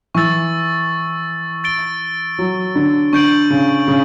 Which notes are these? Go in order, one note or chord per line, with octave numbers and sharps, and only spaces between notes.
E3 C#6 E6 A6
A6 D7 G7
F#3
D3
D3 C#6 G6 D7 F#7
C#3
C#3